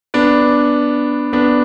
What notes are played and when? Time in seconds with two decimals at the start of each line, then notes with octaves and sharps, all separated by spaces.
0.14 B3 D4
1.33 B3 D4